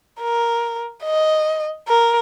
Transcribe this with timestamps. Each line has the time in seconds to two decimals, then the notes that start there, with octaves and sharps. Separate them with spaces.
0.20 A#4
1.04 D#5
1.88 A#4